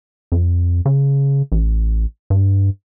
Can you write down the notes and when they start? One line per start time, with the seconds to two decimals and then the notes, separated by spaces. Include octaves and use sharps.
0.32 F2
0.86 C#3
1.52 A1
2.30 G2